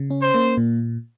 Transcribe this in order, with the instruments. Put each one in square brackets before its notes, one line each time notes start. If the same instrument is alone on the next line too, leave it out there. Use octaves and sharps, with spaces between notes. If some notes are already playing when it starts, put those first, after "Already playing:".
Already playing: [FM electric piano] C#3
C#4
[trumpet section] C5
[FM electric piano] A#3
A#2